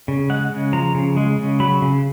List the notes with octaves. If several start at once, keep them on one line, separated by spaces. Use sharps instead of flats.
C#3
G#3 F#5
C#3
F3 A#5
C#3
G#3
C#3
F#3 B5
C#3